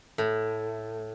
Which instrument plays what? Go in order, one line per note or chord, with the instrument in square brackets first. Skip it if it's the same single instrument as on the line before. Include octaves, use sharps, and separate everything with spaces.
[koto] A2